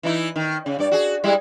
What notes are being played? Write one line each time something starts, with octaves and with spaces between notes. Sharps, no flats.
E3 D#4 E4
D#3
C#3
G2 D5
F#4 G#4
G3 G#3 E4